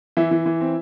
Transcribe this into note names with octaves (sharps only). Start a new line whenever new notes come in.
E3 E4 E5
E3
E3
C4